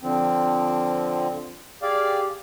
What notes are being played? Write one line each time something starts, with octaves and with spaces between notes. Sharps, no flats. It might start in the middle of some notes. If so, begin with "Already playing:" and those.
D3 F3 C4
G4 G#4 D5 F5